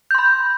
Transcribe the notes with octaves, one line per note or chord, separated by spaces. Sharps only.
B5 C6 G6